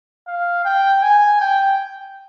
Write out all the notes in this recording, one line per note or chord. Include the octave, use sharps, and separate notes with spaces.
F5
G5
G#5
G5